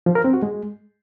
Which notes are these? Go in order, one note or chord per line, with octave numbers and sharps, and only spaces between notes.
F3
A#4
C4
F#4
G#3